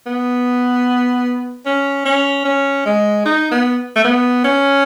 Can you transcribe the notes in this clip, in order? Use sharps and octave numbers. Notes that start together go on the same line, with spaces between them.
B3
C#4
C#4
C#4
G#3
D#4
B3
A3
B3
C#4